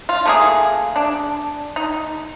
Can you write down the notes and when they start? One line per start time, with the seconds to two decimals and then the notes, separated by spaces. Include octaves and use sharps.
0.09 F4
0.25 A3 A#3 G#4
0.96 D4
1.76 D#4